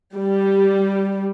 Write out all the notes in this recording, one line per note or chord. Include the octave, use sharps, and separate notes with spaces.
G3